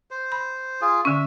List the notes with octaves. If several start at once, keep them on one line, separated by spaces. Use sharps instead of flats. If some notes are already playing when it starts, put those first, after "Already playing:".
C5
B5
F4 G#4
D3 C#4 E5